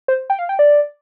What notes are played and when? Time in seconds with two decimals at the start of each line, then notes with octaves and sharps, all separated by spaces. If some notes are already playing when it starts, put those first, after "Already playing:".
0.08 C5
0.30 G5
0.39 F5
0.49 G5
0.59 D5